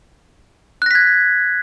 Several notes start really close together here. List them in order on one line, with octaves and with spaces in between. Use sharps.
F#6 A#6 B6 G#6